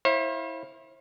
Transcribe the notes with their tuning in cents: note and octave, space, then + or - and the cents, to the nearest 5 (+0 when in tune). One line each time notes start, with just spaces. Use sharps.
E4 -15 C5 +40 F5 +0